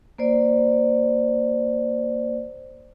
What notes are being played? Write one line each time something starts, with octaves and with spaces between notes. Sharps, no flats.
A#3 C5 D5